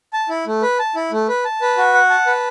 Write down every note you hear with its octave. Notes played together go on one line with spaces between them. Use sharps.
A5
E4
A3
B4
A5
E4
A3
B4
A5
B4
F#4
F#5
A5
B4